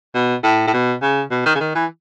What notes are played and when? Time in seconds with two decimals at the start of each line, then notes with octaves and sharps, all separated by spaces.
0.15 B2
0.44 A2
0.67 A2
0.73 B2
1.02 C#3
1.31 B2
1.45 D#3
1.55 C#3
1.60 D#3
1.75 E3